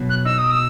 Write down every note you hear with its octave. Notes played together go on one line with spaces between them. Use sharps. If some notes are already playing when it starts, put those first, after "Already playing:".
Already playing: B2 F#3
F#6
D#4 E6
D#6
E6